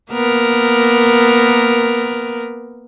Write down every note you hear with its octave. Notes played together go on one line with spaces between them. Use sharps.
A#3 B3 A#4